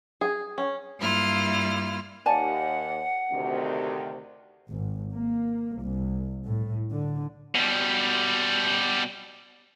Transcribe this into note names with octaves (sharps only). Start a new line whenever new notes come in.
G#4
C#4
G2 A#3 E4 F4 F6
D#2 D5 F#5 G#5 A5
D2 C3 D#3
G#1
A#3
C2
A2
D3
B2 G3